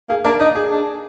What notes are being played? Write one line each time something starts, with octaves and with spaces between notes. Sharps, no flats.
A#3 G#4
A#3 D4 A#4
D4 D#4 D5
G#4
D4